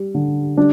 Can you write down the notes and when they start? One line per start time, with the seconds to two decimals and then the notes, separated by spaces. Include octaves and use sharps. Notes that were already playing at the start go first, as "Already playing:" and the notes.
Already playing: G3
0.15 D3
0.57 G3 D4